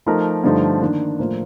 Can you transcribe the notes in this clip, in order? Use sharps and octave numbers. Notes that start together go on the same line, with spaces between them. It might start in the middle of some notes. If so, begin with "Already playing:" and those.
F3 A3 D#4 A#4
G2 D3 F3 A3 D#4
D#3 A#3 D4
A2 F3 A#3 F4 C5